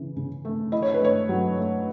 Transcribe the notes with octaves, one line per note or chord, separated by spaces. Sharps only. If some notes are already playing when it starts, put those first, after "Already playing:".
Already playing: C#3 E3
C#3
A3
E4 D#5
C#5
B4
A3 C#5
F#3
A3